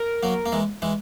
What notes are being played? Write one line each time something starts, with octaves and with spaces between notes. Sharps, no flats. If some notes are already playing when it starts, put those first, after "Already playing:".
Already playing: A#4
F#3 A#3
A#3
E3 G#3
E3 G#3